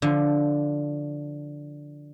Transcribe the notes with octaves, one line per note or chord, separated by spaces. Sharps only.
D3 F3